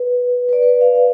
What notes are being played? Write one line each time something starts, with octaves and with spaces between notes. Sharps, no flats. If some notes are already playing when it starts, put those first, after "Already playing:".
Already playing: B4
B4
D5
B4
F5
F5